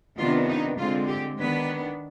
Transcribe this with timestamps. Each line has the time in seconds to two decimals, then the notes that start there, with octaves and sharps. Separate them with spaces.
0.19 C3 D#3 B3 D4 F4
0.49 D#4
0.78 D3 G#3 C4 F4
1.09 G4
1.38 D#3 B3 D4 B4